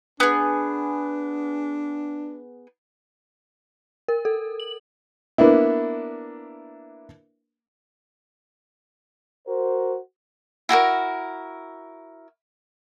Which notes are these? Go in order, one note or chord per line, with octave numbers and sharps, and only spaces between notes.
B3 D4 G#4
A#4
A4
F#7
A#3 B3 D4 E4
F#4 A#4 C5
E4 F#4 G4 A#4